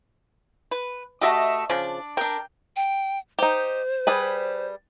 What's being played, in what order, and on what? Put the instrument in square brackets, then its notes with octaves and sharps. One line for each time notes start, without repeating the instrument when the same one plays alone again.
[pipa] B4
[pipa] A3 F#4 G4 [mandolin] D#5 E5 A5
[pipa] C#3 F3 [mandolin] D4 D5
[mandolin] D4 A#4 [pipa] G5
[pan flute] G5
[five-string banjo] D#4 G4 [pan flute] C5
[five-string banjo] G3 G#4 B4